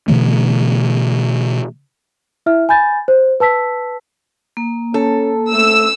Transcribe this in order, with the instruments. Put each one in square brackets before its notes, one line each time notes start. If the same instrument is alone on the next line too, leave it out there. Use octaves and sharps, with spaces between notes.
[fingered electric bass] B2 D3 E3 A3
[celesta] E4 E5 F6
G#5 B5 G6 A6
C5
B4 A5 E6 B6
[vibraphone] A#3
[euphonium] C#4 [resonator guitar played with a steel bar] A4
[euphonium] A3 [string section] E6